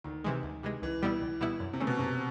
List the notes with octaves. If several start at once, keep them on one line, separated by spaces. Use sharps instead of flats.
D2 D#3
C3 E3 G#3
D2
C3 E3 G#3
C#2 E3
B2 G3 B3 E4
C#2
B2 G3 B3 E4
F#2
C3
C#3 E3 A3 C#4
B2
F#2 C3